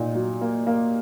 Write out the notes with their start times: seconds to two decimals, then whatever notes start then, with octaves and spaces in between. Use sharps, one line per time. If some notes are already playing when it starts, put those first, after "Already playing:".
Already playing: A#2 D#4
0.15 F#3
0.41 A#3
0.67 A#3